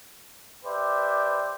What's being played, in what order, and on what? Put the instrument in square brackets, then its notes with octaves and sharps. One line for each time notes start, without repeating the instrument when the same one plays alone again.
[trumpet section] G4 B4 C5 D5 E5